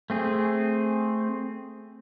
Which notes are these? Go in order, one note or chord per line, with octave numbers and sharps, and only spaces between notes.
A3 C4 G#4